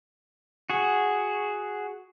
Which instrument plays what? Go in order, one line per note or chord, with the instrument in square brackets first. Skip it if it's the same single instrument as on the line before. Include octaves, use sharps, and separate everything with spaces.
[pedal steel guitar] F#4 G#4